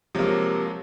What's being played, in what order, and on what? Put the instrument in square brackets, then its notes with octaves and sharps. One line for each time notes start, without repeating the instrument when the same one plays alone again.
[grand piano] C3 A#3 [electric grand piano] F3 F#3 G#3